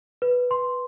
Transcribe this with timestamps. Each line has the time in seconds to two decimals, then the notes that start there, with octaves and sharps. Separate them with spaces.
0.22 B4
0.51 C6